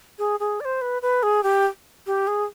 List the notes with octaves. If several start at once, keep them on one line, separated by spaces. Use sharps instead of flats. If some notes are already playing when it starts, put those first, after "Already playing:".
G#4
G#4
D5
C5
B4
B4
G#4
G4
G4
G#4